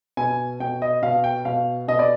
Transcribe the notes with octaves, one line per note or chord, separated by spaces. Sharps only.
B2 G#5
B2 G5
D#5
B2 F5
G5
B2 F5
B2 D#5
D5